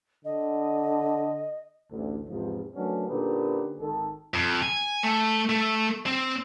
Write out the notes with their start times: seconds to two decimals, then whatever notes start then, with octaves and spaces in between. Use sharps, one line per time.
0.25 D3 D#5
1.91 A1 D2
2.28 E2 G#2 C3 F3
2.75 D#3 F#3 A3 B3 C#4 D4
3.08 A#2 D3 C#4 D#4 G4 B4
3.79 G#1 D#3 A4
4.34 F2
4.62 G#5
5.03 A3
5.50 A3
6.06 C4